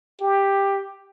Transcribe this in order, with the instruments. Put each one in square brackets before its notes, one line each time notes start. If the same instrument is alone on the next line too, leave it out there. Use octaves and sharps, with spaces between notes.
[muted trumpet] G4